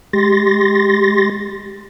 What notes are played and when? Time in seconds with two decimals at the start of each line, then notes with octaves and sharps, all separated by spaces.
0.13 G#3 G4 C6 A6 A#6